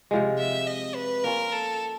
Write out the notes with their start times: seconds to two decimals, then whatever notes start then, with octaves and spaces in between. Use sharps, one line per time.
0.11 C3 F3 G#3
0.39 E5
0.67 D#5
0.95 B4
1.24 A#3 C#4 F4 A#4
1.52 A4